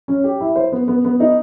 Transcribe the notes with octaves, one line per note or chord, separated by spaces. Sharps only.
C#4
G4
E4
C5
B3
B3
B3
D#4